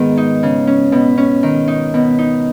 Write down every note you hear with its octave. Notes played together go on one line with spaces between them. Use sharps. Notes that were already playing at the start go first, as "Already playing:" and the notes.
Already playing: G#2 D#3 B3
D#4
C#3
C#4
B2
C#4
D#3
D#4
B2
D#4